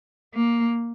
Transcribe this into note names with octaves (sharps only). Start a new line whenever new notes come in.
A#3